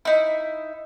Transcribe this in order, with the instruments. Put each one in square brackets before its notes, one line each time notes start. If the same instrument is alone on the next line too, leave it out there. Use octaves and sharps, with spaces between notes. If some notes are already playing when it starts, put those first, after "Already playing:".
[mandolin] D#4 E4